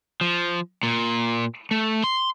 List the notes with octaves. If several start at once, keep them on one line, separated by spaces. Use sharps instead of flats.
F3
A#2
A3
C6